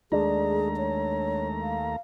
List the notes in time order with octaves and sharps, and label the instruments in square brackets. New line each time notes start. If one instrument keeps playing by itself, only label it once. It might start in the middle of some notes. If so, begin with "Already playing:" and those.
[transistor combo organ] D#2 A3 A#5 [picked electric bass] G#3 D4 [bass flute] G#4
[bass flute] C#5
F5